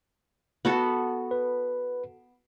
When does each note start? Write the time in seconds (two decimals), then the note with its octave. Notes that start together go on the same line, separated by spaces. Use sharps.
0.65 B3 F#4 A4
1.31 B4